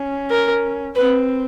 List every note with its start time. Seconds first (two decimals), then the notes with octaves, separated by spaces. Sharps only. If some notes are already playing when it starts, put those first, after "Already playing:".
Already playing: C#4
0.30 A#4
0.96 C4 B4